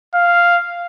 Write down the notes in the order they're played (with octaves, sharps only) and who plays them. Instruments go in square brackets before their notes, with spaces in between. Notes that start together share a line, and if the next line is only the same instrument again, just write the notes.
[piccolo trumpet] F5